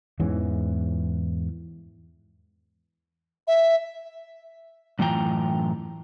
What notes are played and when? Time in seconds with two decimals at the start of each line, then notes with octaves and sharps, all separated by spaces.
0.20 E2 G#2 E3 C#4
3.47 E5
4.99 F#2 A2 E3 F4 G5 A#5